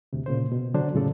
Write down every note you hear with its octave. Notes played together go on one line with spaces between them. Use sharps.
D2 C3
A#2 C#3 C5
B2
D3 F#3 D4 C5
F2 A2 C#3 A4 D5